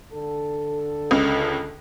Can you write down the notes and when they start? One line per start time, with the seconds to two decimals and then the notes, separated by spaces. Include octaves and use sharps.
0.13 D3 A4
1.11 C#2 C#3